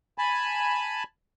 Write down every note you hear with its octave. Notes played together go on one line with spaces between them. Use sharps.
G#5 A5 B5